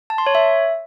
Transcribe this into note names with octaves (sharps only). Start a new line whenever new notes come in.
A5
C6
C#5
E5